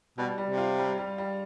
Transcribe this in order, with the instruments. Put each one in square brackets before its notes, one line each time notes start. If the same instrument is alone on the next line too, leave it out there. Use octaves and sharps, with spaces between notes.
[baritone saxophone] B2 [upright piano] G3
[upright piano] G3
[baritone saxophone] C3
[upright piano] F4
G3
G3
G3